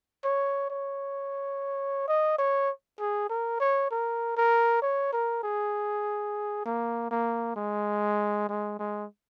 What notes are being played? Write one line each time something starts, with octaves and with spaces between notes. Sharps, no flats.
C#5
C#5
D#5
C#5
G#4
A#4
C#5
A#4
A#4
C#5
A#4
G#4
A#3
A#3
G#3
G#3
G#3